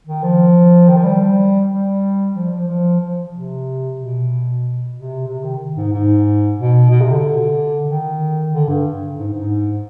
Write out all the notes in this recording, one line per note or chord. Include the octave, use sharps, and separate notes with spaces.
D#3
F3
D#3
F3
G3
G3
F3
F3
F3
F3
C3
B2
C3
C3
D#3
G#2
G#2
B2
B2
C3
D3
D#3
D3
G2
G#2
G#2